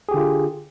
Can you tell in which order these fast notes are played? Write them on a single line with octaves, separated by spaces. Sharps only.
G#4 G4 D3 F4